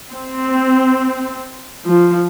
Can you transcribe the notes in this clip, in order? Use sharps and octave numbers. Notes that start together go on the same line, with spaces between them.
C4
F3